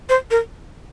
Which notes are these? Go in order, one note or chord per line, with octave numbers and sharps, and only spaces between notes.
C5
A#4